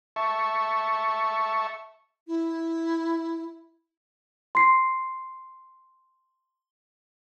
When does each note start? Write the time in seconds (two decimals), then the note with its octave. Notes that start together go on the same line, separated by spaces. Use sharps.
0.16 E5 A5 C#6
2.27 E4
4.55 C6 C7